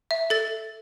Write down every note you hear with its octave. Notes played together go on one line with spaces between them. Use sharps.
E5
A4 A6